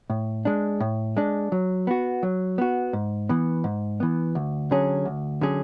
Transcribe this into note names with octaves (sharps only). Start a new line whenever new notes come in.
A2
G#3 D4
A2
G#3 D4
F#3
B3 F#4
F#3
B3 F#4
G#2
E3 B3
G#2
E3 B3
D2
D3 F#3 C#4 G#4
D2
D3 F#3 C#4 G#4